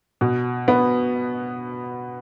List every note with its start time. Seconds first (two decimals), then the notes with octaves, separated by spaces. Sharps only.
0.21 B2
0.68 B3